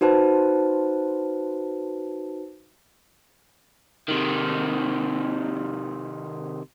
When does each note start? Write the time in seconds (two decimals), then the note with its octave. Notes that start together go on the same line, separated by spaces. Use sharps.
0.01 D#4 F#4 B4 C5 A5
4.08 C3 D#3